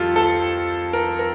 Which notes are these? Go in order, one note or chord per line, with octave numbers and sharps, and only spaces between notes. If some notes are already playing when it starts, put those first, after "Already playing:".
Already playing: F2 D#3 G3 F4 G4 A4
A4
A#4
A#4